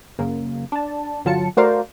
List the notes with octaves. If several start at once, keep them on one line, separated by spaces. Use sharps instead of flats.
F#2 C#3 A#3
D4 A5
G1 D3 F#3 F4 A5 C#7
A3 F#4 A#4 C5 D5 F5